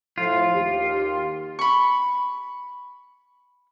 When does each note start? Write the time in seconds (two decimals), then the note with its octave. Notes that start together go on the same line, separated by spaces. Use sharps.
0.18 A2 F3 F4
0.53 D#2 G4
1.59 B5 C#6